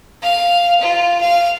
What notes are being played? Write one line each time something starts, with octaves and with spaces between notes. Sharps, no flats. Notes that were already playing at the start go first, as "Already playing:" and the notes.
F5
F4
F5